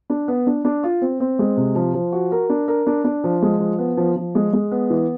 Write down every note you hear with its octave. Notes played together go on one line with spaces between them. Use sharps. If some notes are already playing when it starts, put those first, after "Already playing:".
D4
B3
D4
D4
F4
C4
C4
G#3
C3
F3
F3
F#4
A#4
D4
A#4
D4
D4
F3
G#3
F3
B3
F3
F3
G#3
G#3
B3
E3